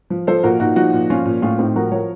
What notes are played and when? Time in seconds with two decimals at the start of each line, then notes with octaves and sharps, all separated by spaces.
0.10 F3
0.27 F3 A4 C5
0.43 A#2 F#4 A#4
0.60 A#2 D#4 F#4
0.76 F3 D#4 F#4
0.93 A#2
1.10 F3 C#4 F4
1.26 A#2
1.42 A2 C#4 F4
1.58 A2 C4 D#4
1.76 F3 F#4 A#4
1.91 F3 A#4 C#5